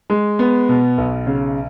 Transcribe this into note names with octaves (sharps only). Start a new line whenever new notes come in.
G#3
B3
B2
B1
C#3